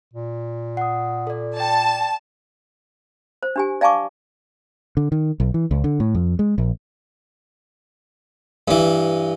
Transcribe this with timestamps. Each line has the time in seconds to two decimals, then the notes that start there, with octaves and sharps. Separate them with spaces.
0.14 A#2
0.77 F#5 D#6
1.27 A4 D5
1.57 D5 G5 A5
3.43 C5
3.56 D4 G4 G#5
3.81 D5 F5 G#5 A5 C#6 D6
4.97 D3
5.12 D#3
5.40 B1
5.54 E3
5.71 C#2
5.84 D3
6.00 A2
6.15 F2
6.39 G#3
6.58 A#1
8.68 G2 E3